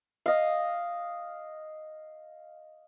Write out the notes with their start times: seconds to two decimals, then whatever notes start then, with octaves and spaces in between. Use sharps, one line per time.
0.26 D#5 F5